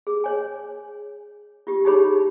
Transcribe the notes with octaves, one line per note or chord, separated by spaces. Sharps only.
G#4
C#5 G#5
F4 G4
D#4 E4 G4 G#4 C#5 B5